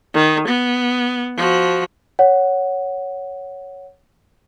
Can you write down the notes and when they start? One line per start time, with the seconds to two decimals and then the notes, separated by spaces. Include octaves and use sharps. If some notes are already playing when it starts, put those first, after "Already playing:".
0.14 D#3
0.48 B3
1.36 F3 F#4
2.19 C#5 F#5